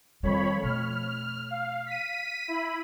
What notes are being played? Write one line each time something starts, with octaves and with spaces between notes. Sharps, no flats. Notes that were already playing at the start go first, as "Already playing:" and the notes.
F2 D#3 G3 C#5 B5
B2 A3 F6
F5
B6 D#7
E4 B5